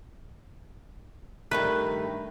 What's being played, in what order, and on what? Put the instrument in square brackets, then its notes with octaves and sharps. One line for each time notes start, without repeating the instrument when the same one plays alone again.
[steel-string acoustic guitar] G2 D#3 A3 [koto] B4